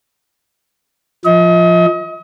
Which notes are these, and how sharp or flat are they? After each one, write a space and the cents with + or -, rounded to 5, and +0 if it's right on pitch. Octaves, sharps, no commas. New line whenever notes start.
F3 +0 D#5 +35